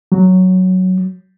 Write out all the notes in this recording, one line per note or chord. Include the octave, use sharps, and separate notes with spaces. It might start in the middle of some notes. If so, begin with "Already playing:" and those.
F#3